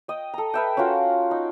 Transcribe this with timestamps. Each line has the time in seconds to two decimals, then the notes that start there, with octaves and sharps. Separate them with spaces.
0.08 D#5 G5
0.34 A4 A#5
0.54 B4 E5 G5
0.77 C#4 F4 F#4 A#4
1.31 D#4